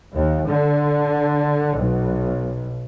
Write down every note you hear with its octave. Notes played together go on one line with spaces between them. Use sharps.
D#2
D3
B1